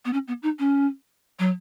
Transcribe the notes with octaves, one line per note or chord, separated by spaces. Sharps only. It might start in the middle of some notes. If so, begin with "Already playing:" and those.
B3
C#4
B3
D#4
C#4
F#3